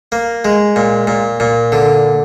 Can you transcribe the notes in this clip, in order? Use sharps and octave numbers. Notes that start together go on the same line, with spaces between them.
A#3
G#3
A#2
A#2
A#2
D3